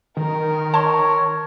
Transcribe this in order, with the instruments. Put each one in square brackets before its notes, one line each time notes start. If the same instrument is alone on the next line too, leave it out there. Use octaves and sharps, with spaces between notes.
[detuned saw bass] D#3 [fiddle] A#4
[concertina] C#5 [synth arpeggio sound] A5 C6